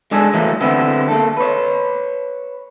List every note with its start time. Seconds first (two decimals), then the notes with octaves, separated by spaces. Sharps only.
0.11 G#3 D4 G#4 A4
0.34 E3 F#3 A3 A#3 D#4
0.61 D3 B3 C4 E4
1.08 A#3 A4
1.37 B4 C#5